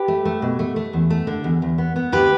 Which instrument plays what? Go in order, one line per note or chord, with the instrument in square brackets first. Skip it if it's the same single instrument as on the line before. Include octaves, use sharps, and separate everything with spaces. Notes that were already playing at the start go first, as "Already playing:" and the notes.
Already playing: [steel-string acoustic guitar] G4 B4
A3
A3
B2
A3
A3
E2
A3
D3
E2
E2
B3
B3
D2 G4 B4